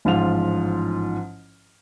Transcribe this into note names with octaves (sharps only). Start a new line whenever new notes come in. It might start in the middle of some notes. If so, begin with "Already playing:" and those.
A1 G#2 F3 F4 F7